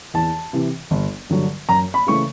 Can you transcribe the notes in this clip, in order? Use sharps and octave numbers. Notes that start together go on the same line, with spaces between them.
E2 A5
C3 E3
G1
G2 D3 F#3
F#2 A#5
B5
C#3 E3 A3 C#6